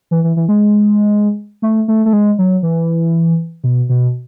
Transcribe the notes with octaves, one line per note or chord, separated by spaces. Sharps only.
E3
E3
E3
G#3
A3
A3
A3
G#3
F#3
E3
B2
B2